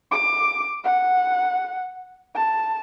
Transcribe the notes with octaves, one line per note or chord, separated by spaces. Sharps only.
D6
F#5
A5